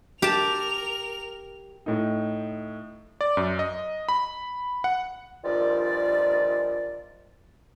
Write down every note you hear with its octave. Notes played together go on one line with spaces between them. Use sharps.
G4 A#4 A5 F7
A2 D#4
D5
F#2
D#5
B5
F#5
G2 A#2 D#3 F3 F4 D5